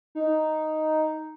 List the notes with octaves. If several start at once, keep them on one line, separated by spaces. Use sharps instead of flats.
D#4